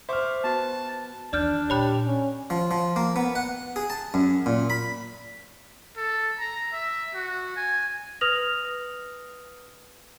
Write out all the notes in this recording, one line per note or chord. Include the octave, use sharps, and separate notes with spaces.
C5 E5 C#6 D6 F6
B3 F#4 B4 A5
D#2 E3 D4 D5 F6 G6
A#2 G4 C#5 B5 F#6
C#4
F3
F3
A#3
B3
F#5
G#4
A5
F#2
A#2
B5
A4
A#5
E5
F#4
G#5
B4 D#6 F6 A#6 F7 F#7